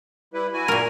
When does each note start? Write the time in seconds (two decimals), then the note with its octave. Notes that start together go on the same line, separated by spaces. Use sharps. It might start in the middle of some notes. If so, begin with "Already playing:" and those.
0.34 G3 E4 B4
0.54 E4 F#4 G#5
0.68 A#2 A#4